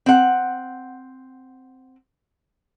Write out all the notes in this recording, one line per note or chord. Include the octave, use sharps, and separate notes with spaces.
C4 F#5